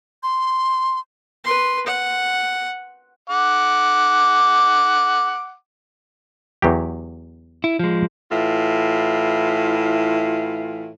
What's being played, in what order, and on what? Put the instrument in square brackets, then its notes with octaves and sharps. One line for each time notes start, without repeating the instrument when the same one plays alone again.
[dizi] C6
[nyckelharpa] B4 C6
F#5
[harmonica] F#5 D6
[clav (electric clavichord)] E2 F#3 G4
[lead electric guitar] E4
F3 G#3
[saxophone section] A2 E3 F4